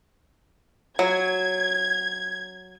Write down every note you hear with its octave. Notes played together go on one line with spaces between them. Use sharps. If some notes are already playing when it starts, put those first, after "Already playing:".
F#3 G#6